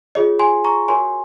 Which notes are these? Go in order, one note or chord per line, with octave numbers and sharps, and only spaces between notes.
F4 G#4 C#5 D#5
G#5 C6
A#5 C#6
F#4 A#4 C#5 G#5 C6